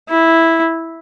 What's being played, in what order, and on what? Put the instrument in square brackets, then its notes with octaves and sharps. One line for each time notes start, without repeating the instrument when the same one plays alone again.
[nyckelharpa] E4